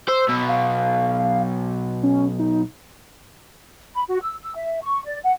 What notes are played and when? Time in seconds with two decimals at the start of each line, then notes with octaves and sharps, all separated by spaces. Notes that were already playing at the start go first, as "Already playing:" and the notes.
0.08 C5 E6
0.28 B1 B2
0.49 F5
2.03 C#4
2.39 D#4
3.94 B5
4.08 F#4
4.22 E6
4.42 E6
4.55 E5
4.82 C#6
5.05 D5
5.23 F#5